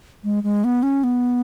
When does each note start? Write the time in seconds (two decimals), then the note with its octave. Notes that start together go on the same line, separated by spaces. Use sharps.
0.24 G#3
0.43 G#3
0.64 B3
0.83 C#4
1.04 B3